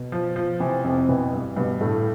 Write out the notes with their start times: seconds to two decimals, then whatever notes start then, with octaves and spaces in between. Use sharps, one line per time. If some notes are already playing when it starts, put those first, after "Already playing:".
Already playing: B2 B3
0.12 F3
0.36 F3
0.60 C3 E3 C4
0.84 F2 C3 C4
0.97 C4
1.09 B2 E3 B3
1.33 G2
1.57 G2 B2 B3
1.81 A2 D3 A3